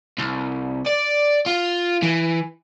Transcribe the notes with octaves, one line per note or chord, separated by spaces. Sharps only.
C2
D5
F4
E3